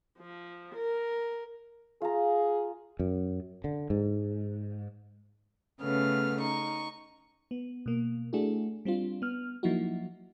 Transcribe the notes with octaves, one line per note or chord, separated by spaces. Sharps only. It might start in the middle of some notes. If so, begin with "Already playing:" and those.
F3
A#4
F4 G#4 A#5
F#2
D3
G#2
C#3 A3 B3 F6
D#4 C#6
B3
B2 A#3
A3 D4 E4 F#4 G#4 A4
G3 C4 D4 F4
B3 F6
F3 F#3 A#3 D#4 E4 F#4